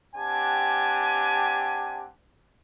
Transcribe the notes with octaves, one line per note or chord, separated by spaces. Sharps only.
C4 D4 G4 F#5 G#5 A5